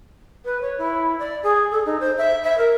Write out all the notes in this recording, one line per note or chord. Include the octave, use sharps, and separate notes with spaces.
B4
C#5
E4
D5
G#4
A4
D#4
C5
E5
E5
A#4